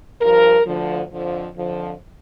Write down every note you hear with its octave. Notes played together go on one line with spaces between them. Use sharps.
G2 F3 A#4
D2 D3 F3
F2 D3 F3
F2 D3 F3